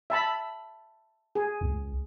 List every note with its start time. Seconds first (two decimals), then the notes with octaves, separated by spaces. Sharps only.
0.10 E5 A5 B5
1.35 G#4
1.61 C#2